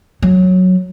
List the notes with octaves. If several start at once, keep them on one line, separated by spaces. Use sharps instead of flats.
F#3